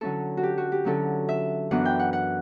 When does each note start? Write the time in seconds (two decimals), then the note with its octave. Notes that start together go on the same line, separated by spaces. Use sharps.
0.01 D3 F#3 C#4 E4 A4
0.37 F#4
0.43 G4
0.58 F#4
0.72 G4
0.85 D3 F#3 C#4 E4 A4
1.29 E5
1.71 F#2 E3 B3 D4 F#5
1.85 G5
1.99 F#5
2.13 F#5